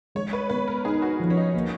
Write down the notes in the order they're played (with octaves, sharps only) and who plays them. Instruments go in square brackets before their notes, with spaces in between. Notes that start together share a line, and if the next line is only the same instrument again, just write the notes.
[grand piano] G#3 [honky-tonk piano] C#5
[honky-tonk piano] B4
[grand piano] B3 [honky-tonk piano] B4
[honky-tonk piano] A#4
[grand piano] D#4 [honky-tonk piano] G#4
[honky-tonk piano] F#4
[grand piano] F3
[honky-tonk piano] C#4
D#4
[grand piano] A#3